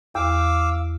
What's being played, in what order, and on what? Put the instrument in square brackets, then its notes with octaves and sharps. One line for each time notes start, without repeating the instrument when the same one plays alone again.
[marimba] E2 [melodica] F5 D6 E6